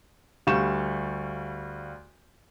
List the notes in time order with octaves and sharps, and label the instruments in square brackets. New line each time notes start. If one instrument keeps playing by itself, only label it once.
[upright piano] D2 G3 F5 C#6 G6 E7